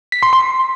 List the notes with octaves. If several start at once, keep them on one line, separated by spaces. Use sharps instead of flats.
B6
C6
C6